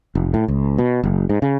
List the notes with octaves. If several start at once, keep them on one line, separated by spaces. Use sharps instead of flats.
F1
A2
C#2
B2
F#1
G#2
C#3